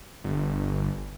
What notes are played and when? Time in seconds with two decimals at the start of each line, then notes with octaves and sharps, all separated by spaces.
0.24 G1